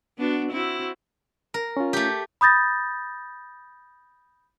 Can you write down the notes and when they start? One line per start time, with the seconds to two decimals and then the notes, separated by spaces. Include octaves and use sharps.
0.18 B3 D4 F#4
0.51 C4 E4 F#4
1.54 A#4
1.77 C#4 F4
1.93 A3 G4
2.41 B5 D#6 G6 A6 A#6